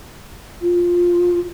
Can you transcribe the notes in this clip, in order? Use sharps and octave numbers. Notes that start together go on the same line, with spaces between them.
F4